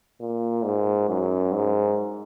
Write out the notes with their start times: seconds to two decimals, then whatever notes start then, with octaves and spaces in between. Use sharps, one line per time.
0.20 A#2
0.64 G#2
1.08 F#2
1.52 G#2